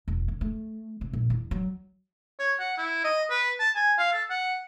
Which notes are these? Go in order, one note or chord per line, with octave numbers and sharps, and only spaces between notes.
E1
C3
A3
C3
A#1
E2
F#3
C#5
F#5
E4
D#5
B4
A5
G#5
F5
A4
F#5